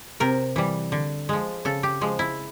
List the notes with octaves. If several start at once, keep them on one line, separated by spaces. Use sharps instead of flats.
C3 A#4
E3 G3
D3
F3 G#3
C#3 A4
G4
F3 G#3
E4